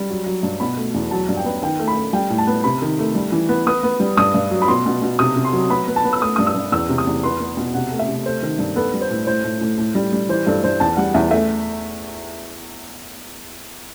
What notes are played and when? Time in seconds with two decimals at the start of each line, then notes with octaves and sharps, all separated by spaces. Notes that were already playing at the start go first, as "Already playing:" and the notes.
Already playing: G3
0.10 F#3
0.26 F#3
0.43 G2
0.60 B2 B5
0.77 A3
0.94 E2
1.11 F#3 A5
1.29 G2
1.37 G5
1.45 B3
1.62 D#3 G5
1.79 A3
1.88 B5
1.96 A3
2.13 G3 G5
2.30 A2
2.38 A5
2.47 B3
2.64 C3 B5
2.82 D#3
2.99 A3
3.15 G3
3.32 E3
3.49 B3
3.66 B3 D#6
3.83 B3
4.00 G3
4.17 G2 D#6
4.34 G2
4.51 F#3
4.62 B5
4.68 B2 C6
4.86 B2
5.02 B2
5.19 C3 D#6
5.36 C3
5.45 C6
5.53 F#3
5.70 B3 B5
5.87 B3
5.96 A5
6.05 B3
6.13 E6
6.21 A3 D#6
6.36 G2 D#6
6.47 E6
6.55 G2
6.72 E2 E6
6.89 C3
6.98 D#6
7.07 E2
7.23 B3 C6
7.40 B3
7.57 B2
7.74 C3 F#5
7.91 A3
7.99 E5
8.08 C3
8.26 A3 C5
8.42 D#3
8.59 G2
8.76 B3 A4
8.94 G3
9.01 C5
9.10 A2
9.27 A2 C5
9.44 A2
9.61 A2
9.78 A2
9.95 G3
10.13 G3
10.29 E3 C5
10.46 G2 A4
10.63 G2 C5
10.80 E2 A5
10.97 G3 F#5
11.14 E2 E5
11.31 A3 E5